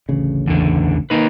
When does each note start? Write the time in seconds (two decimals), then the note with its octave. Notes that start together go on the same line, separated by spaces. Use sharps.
0.09 A1 D2 C#3
0.47 E2 D3
1.10 A#3 D#4 B4